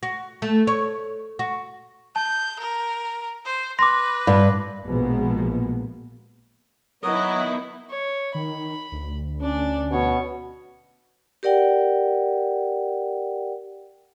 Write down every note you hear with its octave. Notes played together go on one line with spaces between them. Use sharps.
F#4
A3
C#5
F#4
A5 G6
A#4
C5
B4 C6 D6 A#6
G2 B5
A#1 B2 F3 G#3 A#3 B3
F#3 B3 E4 A#4 D#5 D#6
C#5
D#3 B5
D2
C#4 D4 D5
B2 C#5
G4 A#4 D5 F#5 G5